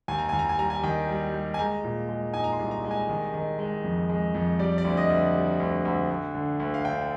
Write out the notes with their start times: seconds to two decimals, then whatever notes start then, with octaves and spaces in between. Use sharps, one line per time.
0.08 D#2 G#5
0.19 A#5
0.29 D#2 G#5
0.39 A#5
0.49 G#5
0.59 G3 A#5
0.70 G#5
0.84 D#3 G5
1.09 G3
1.34 G3
1.54 G#5
1.59 G#3 A#5
1.84 A#2
2.09 G#3
2.34 D#4 G#5
2.44 A#5
2.52 C6
2.59 C2
2.71 A#5
2.84 G#3
2.91 G#5
3.09 D#3
3.34 D#3
3.59 G#3
3.84 F2
4.09 G#3
4.34 F2
4.59 G3 D5
4.78 D5
4.85 D2
4.97 D#5
5.10 D2
5.34 G3
5.60 D2
5.85 D2
6.10 D2
6.35 D3
6.60 D2
6.74 F5
6.85 D3 G5